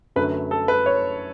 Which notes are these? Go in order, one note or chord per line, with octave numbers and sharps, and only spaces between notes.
F#2 D3 F#3 A3 B4
A4
B4
C#5